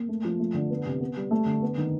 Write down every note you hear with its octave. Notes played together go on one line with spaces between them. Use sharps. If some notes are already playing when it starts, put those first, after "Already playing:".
Already playing: A#3
A3
F3
A3
D3
B3
C3
B3
G3
A3
D3
B3
D#3